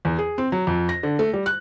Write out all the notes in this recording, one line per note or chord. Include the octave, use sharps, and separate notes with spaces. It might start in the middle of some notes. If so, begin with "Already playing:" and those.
E2
G#4
C4
F#3
F2
A#6
D3
A3
G3
F#6